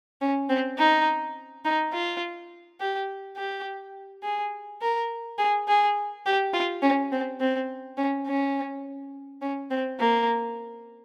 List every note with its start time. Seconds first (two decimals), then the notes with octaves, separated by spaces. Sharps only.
0.21 C#4
0.49 C4
0.78 D#4
1.65 D#4
1.93 F4
2.80 G4
3.37 G4
4.23 G#4
4.81 A#4
5.39 G#4
5.68 G#4
6.26 G4
6.53 F4
6.82 C#4
7.12 C4
7.40 C4
7.97 C#4
8.27 C#4
9.42 C#4
9.70 C4
9.99 A#3